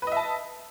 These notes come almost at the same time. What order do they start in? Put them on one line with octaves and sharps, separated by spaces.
B4 D#5 E5 A5